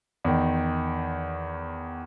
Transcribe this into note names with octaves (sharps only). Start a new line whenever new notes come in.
E2 D#3